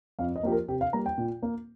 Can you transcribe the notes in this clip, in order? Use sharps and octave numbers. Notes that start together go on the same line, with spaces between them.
F2 F5
D#5
F3 A#3 G4
A#4
C3 G4
F5
G3 A#3 A#5
G5
A#2
A#3